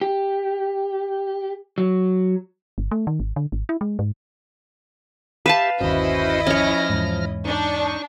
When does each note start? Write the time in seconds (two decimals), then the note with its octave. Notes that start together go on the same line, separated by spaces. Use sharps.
0.01 G4
1.78 F#3
2.78 G1
2.91 A3
3.07 D#3
3.20 G#1
3.36 D3
3.52 G#1
3.69 E4
3.81 G#3
3.99 G#2
5.46 G4 B4 E5 F5 A5
5.81 G1 D#2 C#4 E4 F#4 C5 D#5
6.47 F3 C#4 C#5 F6 A#6
6.89 E2 G#2
7.45 D4 D#4 C#6